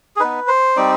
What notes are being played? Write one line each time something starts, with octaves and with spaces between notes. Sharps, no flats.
G#4
B3 D#4 B4
C5
G3 C4 D#4 D5